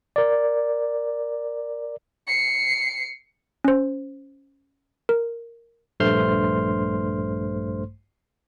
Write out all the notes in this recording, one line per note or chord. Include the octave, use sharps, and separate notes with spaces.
A#4 D5
C7 C#7
C#4 C5
A#4
A#1 G2 A3 C5 C6 F6